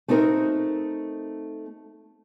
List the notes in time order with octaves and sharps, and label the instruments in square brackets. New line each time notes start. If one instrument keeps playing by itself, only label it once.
[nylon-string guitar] A3 C4 D#4 F#4 A#4